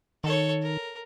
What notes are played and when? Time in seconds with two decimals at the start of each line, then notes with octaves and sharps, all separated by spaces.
0.24 D#3 A4 C#5
0.62 A#4